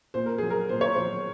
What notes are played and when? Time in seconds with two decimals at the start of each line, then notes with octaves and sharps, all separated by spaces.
0.14 A#2 C5
0.26 A#4
0.38 F#3 G#4
0.50 A#4
0.69 A#2 C5
0.81 C#5
0.92 C5
0.98 F#3